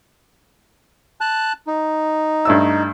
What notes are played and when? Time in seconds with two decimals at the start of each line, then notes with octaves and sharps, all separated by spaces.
1.21 A5 F#6
1.67 D#4
2.45 G2 A3 E6